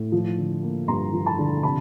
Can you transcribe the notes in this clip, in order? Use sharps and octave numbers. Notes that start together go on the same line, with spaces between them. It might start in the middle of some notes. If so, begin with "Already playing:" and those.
Already playing: A2
F3
D3
A#3
G2 A#5 C6
F3
A5 B5
D3
C3 A5 B5